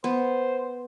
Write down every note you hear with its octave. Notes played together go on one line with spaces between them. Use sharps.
B3 C5